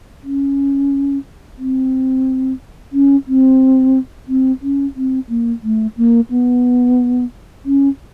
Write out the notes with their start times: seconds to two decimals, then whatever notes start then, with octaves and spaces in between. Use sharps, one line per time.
0.23 C#4
1.58 C4
2.93 C#4
3.28 C4
4.28 C4
4.62 C#4
4.96 C4
5.29 A#3
5.63 A3
5.97 A#3
6.30 B3
7.65 C#4